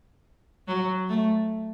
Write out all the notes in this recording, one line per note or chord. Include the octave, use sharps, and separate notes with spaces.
F#3
A3